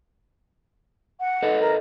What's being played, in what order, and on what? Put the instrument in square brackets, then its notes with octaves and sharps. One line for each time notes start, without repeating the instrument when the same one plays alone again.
[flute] F#5
[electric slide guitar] A4 B4 D#5
[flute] A#4